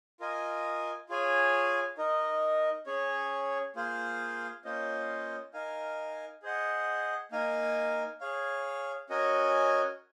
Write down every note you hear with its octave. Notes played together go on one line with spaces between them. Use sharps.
F4 A#4 D#5 G#5
F4 G#4 C#5 G#5
D#4 A#4 D#5
C#4 G#4 C#5
A#3 F4 G#4 C5 F5
A#3 C#4 F4 C5 D#5
D#4 A#4 F5 G#5
G#4 C5 D#5 F#5
A#3 D#4 A#4 F5 G#5
G#4 C#5 F5
C#4 F#4 A#4 D#5 G#5